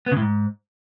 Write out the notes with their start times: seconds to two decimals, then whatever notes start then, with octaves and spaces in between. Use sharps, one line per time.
0.06 B3
0.12 C#3
0.17 A2
0.22 G#2